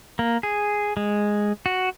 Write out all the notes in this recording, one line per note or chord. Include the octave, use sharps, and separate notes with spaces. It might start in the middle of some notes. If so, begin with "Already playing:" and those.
A#3
G#4
G#3
F#4